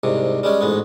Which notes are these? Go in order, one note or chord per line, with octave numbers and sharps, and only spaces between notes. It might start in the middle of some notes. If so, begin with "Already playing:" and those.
C2 G#2 C3
G3 G#3 C#4
A1 G#2 G#3 B3